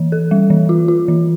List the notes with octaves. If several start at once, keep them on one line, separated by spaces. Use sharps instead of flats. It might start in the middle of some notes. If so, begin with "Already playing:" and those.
Already playing: E3
A4
G3
E3
F4
F4
E3